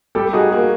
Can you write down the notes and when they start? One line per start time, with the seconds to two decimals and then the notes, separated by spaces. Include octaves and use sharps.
0.15 G3 G4 A4
0.33 D#4 F#4 G#4
0.51 A#3 F#4 G#4